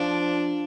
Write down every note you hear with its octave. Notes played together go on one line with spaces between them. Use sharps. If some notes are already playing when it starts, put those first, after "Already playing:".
Already playing: F3 D4